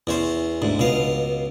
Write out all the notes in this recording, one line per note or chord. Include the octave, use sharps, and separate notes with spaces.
E2 C#4 C5
D2 G#2
C#2 B2 F5